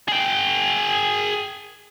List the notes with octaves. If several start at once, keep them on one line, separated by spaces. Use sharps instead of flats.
G#4 G5